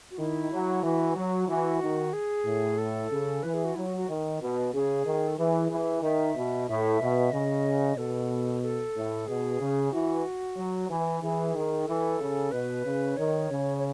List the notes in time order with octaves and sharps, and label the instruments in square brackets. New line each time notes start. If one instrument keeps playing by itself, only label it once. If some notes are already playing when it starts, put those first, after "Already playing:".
[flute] F#4
[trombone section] D#3 [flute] E4
[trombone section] F#3
[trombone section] E3 [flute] F#4
[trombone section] F#3
[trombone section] E3 [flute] F#4
[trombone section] D#3
[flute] G#4
[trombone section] A2
[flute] A4
[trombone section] C#3
[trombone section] E3 [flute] B4
[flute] G#4
F#4
[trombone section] F#3 [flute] E4
[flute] F#4
F#4
[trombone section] D#3
B2
[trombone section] C#3 [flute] G#4
[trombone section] D#3
[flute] A4
[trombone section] E3 [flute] G#4
[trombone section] E3
[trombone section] D#3 [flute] E5
[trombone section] B2
[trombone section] A2 [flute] E5
[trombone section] B2
[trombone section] C#3 [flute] D#5
[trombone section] B2 [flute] A4
[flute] A4
[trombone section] A2
[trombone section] B2 [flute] G#4
[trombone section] C#3
[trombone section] E3 [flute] F#4
[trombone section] F#3
E3
[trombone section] E3 [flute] G#4
[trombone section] D#3
[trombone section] E3 [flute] A4
[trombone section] C#3
[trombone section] B2 [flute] B4
[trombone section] C#3
[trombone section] D#3 [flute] C#5
[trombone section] C#3
[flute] C#5